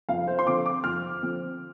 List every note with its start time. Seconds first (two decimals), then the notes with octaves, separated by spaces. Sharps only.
0.09 F2 F5
0.27 C5
0.39 C6
0.46 D3 F3 C4 D6
0.66 D6
0.84 F2 F6
1.22 D3 F3 C4